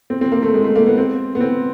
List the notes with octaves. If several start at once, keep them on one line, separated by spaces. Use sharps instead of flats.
C4
C4
A#3
A3
G#3
A3
A#3
B3
C4
B3
C4